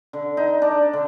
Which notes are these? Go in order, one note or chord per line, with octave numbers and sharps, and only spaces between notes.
D3
D#4
D4
D3